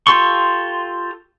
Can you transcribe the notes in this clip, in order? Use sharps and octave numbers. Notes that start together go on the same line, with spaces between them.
F4 G4 A4 C6 C#6